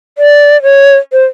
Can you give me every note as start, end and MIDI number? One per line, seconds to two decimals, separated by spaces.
0.18 0.61 74
0.63 0.96 73
1.12 1.24 72